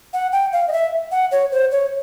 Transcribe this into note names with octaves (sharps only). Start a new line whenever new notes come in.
F#5
G5
F5
D#5
E5
F#5
C#5
C5
C#5